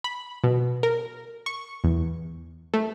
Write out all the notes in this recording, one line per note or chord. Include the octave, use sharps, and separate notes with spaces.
B5
B2
A#4
C#6
E2
A3